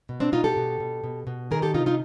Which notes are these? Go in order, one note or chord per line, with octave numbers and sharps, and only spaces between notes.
B2
C4 D4
B2 D#4 F4
G4 A4
B2
B2
B2
B2
D#3 G#4 A#4
G4 A4
C3 D#4 F4
D#4 F4